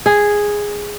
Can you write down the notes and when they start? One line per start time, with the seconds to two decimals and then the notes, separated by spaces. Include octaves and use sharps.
0.06 G#4